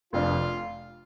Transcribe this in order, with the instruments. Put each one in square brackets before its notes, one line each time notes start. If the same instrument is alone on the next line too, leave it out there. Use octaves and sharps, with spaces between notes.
[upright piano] F1 F2 F3 D4 [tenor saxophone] F4